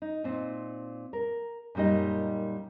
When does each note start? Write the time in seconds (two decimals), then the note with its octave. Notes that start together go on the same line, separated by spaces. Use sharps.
0.02 D#4
0.24 A#2 C4 D#4
1.13 A#4
1.75 F#2 A#2 G3 D#4 D#5